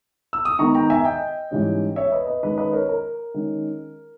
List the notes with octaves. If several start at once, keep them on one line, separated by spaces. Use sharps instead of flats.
E6
D#6
D#3 G#3 B3 D#4 A#5 C#6
G5 A#5
E5 G#5
D#5 G5
G#2 E3 G3 C#4
C#5 E5
B4 D#5
B4 D#5
D#3 G#3 C#4 B4
B4 D#5
A#4 C#5
A#4
D#3 G#3 C#4